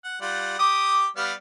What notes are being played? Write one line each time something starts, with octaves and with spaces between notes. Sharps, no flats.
F#5
G3 F4 F#5
G4 D6 D#6
G3 B3 F5